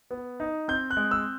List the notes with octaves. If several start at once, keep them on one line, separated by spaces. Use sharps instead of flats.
B3
D#4
C4 G6
F#6
G#3
E6